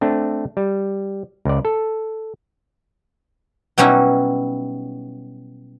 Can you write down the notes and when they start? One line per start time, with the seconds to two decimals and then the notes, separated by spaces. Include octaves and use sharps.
0.01 A3 C4 D4
0.57 G3
1.45 C#2 D5
1.65 A4
3.78 B2 F#3 G3 C#4 D#4 E4